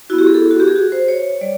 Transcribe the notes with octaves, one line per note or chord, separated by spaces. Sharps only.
B3 E4 F#4
G4
G#4
A4
F#4
G4
G#4
F#4
C5
C#5
G3 D5